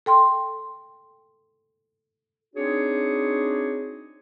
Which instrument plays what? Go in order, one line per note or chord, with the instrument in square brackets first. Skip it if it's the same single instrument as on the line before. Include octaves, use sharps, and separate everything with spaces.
[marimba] A4 G5 C6
[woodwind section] C4 D4 D#4 F#4 G#4 C#5